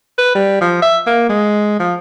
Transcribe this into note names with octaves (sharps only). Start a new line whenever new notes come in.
B4
G3
F3
E5
A#3
G#3
F3